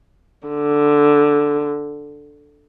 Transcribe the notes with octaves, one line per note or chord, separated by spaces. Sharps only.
D3